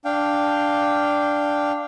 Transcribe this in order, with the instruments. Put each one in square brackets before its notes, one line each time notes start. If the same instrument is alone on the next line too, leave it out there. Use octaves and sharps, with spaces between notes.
[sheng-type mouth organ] D4 F5 G5